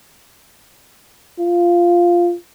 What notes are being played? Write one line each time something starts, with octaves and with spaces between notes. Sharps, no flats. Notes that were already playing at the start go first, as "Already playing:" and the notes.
F4